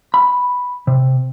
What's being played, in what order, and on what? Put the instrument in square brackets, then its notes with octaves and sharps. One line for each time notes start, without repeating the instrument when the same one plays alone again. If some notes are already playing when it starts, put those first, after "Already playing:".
[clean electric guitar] B5
C3